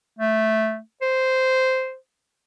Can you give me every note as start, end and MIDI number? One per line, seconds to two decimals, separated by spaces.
0.19 0.80 57
1.02 1.96 72